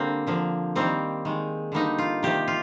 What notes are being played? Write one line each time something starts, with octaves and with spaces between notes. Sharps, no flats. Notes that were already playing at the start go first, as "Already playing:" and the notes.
Already playing: D3 G3 A#3 C4
D3 F3 A#3
D#3 G3 A#3 C4
D#3 G#3
D3 G3 A#3 D#4
F4
C3 D#3 A#3 G4
F4